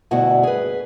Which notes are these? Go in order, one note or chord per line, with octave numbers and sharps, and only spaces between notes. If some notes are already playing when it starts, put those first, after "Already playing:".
D2 G2 B2 E4 F#4 F#5
G#4 B4